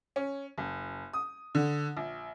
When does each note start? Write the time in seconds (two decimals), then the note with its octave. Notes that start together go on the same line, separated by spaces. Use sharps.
0.16 C#4
0.58 F#1
1.13 D#6
1.55 D3
1.97 A#1